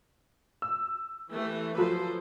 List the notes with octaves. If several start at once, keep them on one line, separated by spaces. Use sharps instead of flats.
E6
E3 A3 G4
F3 F#3 A4 B4 C5